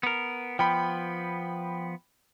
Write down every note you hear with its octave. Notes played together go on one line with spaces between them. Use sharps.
B3 A#4
F3 B3 G5 B5